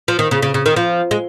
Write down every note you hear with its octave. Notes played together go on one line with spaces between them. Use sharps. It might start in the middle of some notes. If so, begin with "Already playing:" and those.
F3
D#3
C#3
C#3
C#3
D#3
F3
G#3